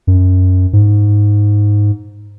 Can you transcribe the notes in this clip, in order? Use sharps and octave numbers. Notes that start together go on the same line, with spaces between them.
F#2
G#2